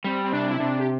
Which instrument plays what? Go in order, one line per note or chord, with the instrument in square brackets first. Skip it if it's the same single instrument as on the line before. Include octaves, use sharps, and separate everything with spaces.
[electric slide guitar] G3 [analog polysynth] C4
[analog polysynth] C4
[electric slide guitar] C3 [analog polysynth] D4
[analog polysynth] E4
[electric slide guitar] C3 [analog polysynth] D4
[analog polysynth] G4